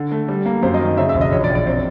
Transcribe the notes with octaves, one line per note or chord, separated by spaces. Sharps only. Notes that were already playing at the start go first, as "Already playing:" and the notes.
Already playing: D3
A3
G3
A#3
F#2 C5
D#5
D#3
C#3 E5
E5
E1
D#5
A#1 C#5
D5
A#1
D5
C4